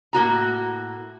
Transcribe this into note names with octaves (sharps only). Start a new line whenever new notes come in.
A2 A#3 F#4 A#5